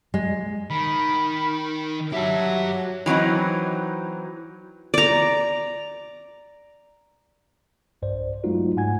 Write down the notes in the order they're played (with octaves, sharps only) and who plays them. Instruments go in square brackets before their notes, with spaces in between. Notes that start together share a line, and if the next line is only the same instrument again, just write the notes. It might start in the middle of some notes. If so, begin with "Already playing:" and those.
[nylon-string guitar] G#3
[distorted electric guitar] D#3 [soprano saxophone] B5
[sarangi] F#3 [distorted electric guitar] G4 A5 [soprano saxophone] E5
[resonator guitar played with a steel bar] E3 F#3 C4 D#4
[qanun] D5 A#5
[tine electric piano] B1 G2 C5 D5
F#3 G#3 A3 D#4 F4 F#4
G#2 F#5 G#5 G#6